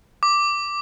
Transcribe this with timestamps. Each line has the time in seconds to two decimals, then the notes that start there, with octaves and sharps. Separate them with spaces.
0.23 D6